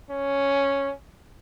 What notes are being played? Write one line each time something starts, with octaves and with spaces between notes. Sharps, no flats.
C#4